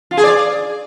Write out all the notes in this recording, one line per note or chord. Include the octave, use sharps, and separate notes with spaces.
F4
G#4
D5